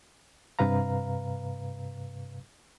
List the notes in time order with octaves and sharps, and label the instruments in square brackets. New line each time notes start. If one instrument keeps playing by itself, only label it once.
[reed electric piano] G2 C3 B4 F5 A#5